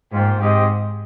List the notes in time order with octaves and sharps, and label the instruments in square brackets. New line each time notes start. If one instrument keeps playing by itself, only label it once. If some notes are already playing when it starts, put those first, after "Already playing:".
[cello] G#2 [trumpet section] A#3 F4 C5 G5
[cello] G#2 [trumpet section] C4 G4 C5 D#5